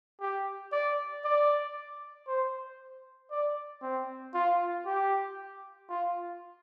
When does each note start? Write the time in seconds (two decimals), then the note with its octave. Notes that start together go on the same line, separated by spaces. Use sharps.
0.21 G4
0.72 D5
1.25 D5
2.28 C5
3.31 D5
3.82 C4
4.34 F4
4.86 G4
5.89 F4